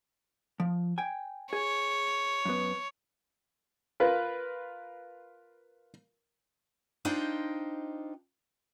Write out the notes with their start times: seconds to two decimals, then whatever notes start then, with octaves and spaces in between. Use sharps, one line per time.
0.60 F3
0.98 G5 G#5
1.53 G#4 C#5
2.45 F#2 B3
4.00 F4 A#4 B4
7.05 D4 D#4 F4 C5 D#5 G5